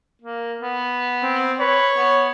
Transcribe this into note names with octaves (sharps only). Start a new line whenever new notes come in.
A#3
B3
C4
B4 C#5
B3